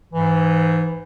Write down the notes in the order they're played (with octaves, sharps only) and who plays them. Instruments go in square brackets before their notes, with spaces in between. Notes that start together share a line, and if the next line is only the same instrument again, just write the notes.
[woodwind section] G#2 E3